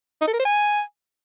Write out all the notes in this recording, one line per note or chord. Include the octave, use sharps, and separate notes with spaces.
D#4
A4
A#4
C5
G#5